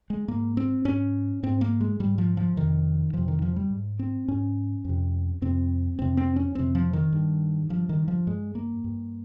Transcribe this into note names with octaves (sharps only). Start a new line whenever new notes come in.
G#3
G#2 A#3
C4
G#2 C#4
G#2 C4
A#3
G#3
G#2 G3
F3
F3
F2 C3 D#3
F2 C3 F3
D#3
F3
G3
G#2
C4
G#2 C#4
F2 C3
F2 C3 C4
F2 C3 C4
C4
C#4
F2 C3 C4
F3
D#3
G2
G2 F3
D#3
F3
G2 G#3
A#3
G2